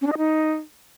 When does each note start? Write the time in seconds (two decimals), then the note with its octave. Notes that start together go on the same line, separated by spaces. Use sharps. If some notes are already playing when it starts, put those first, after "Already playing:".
0.01 C#4
0.07 D4
0.12 D#5
0.17 D#4